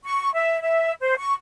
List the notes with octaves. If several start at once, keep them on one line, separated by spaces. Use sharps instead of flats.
C#6
E5
E5
C5
C#6